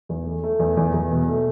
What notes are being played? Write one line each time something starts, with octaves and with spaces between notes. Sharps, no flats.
E2
A3
A3
E2
E2
E2
B2
A3